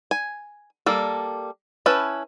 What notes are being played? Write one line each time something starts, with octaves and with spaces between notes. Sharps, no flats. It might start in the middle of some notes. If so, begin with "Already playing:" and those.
G#5
G3 A#3 A4
C#4 E4 B4 A5